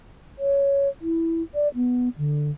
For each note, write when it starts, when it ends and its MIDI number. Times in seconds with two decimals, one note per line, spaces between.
0.39 0.89 73
1.02 1.42 64
1.55 1.68 74
1.75 2.09 59
2.18 2.51 50